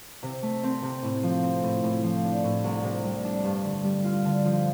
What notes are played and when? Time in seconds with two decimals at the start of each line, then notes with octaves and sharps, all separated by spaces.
0.23 C3
0.43 A3
0.63 C4
0.83 C3
1.03 A2
1.23 F3
1.43 C4
1.63 A2
1.83 A2
2.04 F3
2.24 D4
2.44 A2
2.64 C2
2.83 C3
3.04 G3
3.24 D4
3.44 G2
3.64 D3
3.84 G3
4.04 F4
4.25 D3
4.45 F3